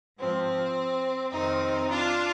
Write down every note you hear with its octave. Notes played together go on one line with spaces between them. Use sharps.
G#2 F3 C4
F2 C3 D#3 C4 D#4
D4 F4